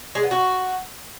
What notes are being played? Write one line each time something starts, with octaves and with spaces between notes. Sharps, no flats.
G#3
B3
F#4